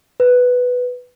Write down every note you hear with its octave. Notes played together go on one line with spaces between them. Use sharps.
B4